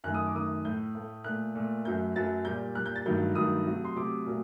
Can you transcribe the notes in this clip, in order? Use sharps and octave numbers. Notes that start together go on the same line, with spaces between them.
F#2 D#3 A3 F#6
D#6
D6
F#2 D#3 A3 D#6
A2 A3 G6
A2 A3
A#2 A3 F#6
A#2 A3
F#2 F#3 A3 G6
F#2 F#3 A3 A6
A#2 G3 G6
A#2 G3 F#6
G6
A6
G2 D#3 F#3 A3 G6
G2 D#3 F#3 A3 D#6
C3 F#3 A3
C6
C3 F#3 A3 D6
A#2 F#3 A3